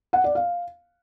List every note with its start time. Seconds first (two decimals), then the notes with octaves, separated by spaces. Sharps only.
0.13 F#5
0.24 D5
0.35 F5